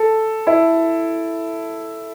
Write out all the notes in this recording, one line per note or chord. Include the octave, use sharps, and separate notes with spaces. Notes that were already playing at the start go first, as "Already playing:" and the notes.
Already playing: A4
E4